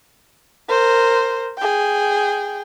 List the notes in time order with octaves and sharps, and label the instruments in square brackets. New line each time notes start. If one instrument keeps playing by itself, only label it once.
[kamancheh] A#4 C5
G#4 G5